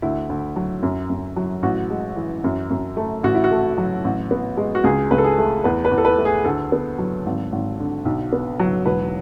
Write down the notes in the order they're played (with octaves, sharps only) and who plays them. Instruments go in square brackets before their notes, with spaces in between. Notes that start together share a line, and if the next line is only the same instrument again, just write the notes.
[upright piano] D2 E4
D2
F#3
F#2
F#2
F#3
A1 F#4
G#3
E3
F#2
F#2
A3
A1 F#4
E4
F#4
A3
F#3
A1
B3
G#3
F#4
C#2 G#4
C#2 B4
A4
G#4
A3
E2 B4
B4
E2
A4
B4
A3
G#4
D2 A4
B3
F#3
G#1
G#1
D3
B1
B3
F#3
E1 B4